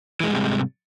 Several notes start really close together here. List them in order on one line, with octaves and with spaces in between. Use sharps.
E3 G#3 G#2 G3 C3